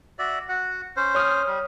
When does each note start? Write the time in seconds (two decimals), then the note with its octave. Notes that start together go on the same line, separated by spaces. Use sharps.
0.19 F#4 D5 E5
0.49 F#4 F#5
0.97 C#4 C5
1.15 C#5 D#6 F6
1.47 G3